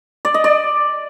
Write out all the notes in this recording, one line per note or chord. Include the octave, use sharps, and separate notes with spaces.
D5
D#5
D5